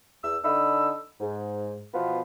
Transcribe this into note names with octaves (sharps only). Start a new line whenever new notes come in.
E2 E6
D3 D4 D#4 B5 E6
G#2
B2 E3 F3 B3 F4 B4